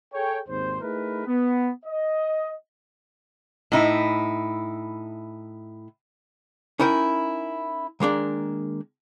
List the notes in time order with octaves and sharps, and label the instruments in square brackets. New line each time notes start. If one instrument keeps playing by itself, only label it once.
[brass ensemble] G#4 A4 C#5 G5
G#1 D#2 G#2 C4 C5
A3 D#4 E4 G#4 A#4 B4
B3
D#5
[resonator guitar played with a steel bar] A2 D#4 E4
[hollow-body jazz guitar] C#4 D#4 E4 A#4 G5
D#3 G#3 A#3 D4